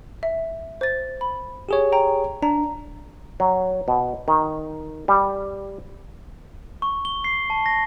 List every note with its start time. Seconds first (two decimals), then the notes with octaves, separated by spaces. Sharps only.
0.23 E5
0.81 C5 A6
1.21 B5
1.69 G4 G#4 C#5
1.92 G5 A#5
2.43 D4 A#5
3.40 F#3
3.88 B2
4.28 D#3
5.08 G3
6.82 C#6
7.05 G7
7.24 C7
7.50 A5
7.66 A#6